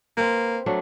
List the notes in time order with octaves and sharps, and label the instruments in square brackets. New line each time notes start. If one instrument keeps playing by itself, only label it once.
[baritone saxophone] A#3 [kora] C4 B4
[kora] F#3 A3 D4